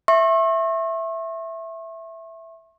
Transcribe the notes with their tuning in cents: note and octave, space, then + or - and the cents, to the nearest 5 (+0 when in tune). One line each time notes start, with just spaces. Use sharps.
E5 +0 C#6 -40